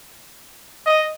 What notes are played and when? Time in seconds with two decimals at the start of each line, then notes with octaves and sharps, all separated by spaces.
0.86 D#5